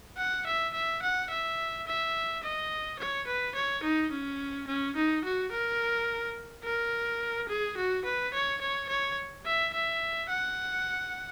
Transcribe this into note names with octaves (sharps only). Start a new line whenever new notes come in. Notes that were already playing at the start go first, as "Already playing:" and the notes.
F#5
E5
E5
F#5
E5
E5
D#5
C#5
B4
C#5
D#4
C#4
C#4
D#4
F#4
A#4
A#4
G#4
F#4
B4
C#5
C#5
C#5
E5
E5
F#5